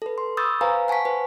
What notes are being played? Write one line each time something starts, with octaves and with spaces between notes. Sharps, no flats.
A4 B4
C6
B5 C#6 D#6 E6 G6 A6
B4 C5 F5 G#5 A#5
F#5 G#5 A5 C#6 B6
B4 C5